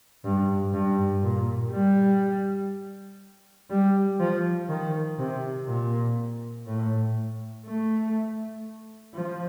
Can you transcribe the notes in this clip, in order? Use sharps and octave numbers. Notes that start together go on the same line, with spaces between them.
G2
G2
A#2
G3
G3
F3
D#3
C3
A#2
A2
A3
F3